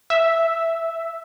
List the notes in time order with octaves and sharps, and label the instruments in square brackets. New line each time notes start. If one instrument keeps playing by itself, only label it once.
[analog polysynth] E5